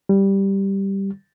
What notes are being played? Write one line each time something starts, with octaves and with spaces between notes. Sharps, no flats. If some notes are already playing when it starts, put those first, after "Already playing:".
G3